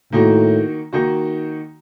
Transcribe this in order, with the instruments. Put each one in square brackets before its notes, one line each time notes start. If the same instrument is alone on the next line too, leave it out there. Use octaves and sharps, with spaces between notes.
[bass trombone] A2 [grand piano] D#3 A#3 D#4 F#4
[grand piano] D#3 A#3 D#4 F#4